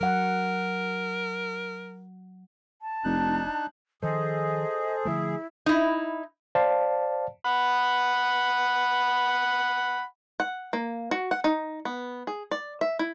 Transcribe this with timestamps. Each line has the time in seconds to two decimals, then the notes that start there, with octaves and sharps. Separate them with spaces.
0.01 F#3 A#4 F#5
2.82 A5
3.04 F1 D4 D#4 F#6
4.02 D#3 F3 G#4 A4 C5 D#5
5.05 D3 F3 A3 E4
5.66 D#4 E4
6.55 C5 D5 F5 A5
7.45 F#5 B5
10.40 F#5
10.73 A#3
11.11 F#4
11.31 F#5
11.44 D#4
11.85 B3
12.27 G#4
12.51 D5
12.81 E5
12.99 E4